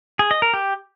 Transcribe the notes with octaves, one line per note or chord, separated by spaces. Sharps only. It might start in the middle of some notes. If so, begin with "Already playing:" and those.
G#4
D#5
A#4
G4